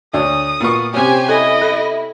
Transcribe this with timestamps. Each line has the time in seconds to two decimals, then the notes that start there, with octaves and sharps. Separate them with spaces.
0.14 D2 D4 C#5 D#6
0.60 A#2 B3 C#6
0.94 C3 C#4 G4 C5 G#5
1.29 E4 A4 D#5
1.62 A4 E5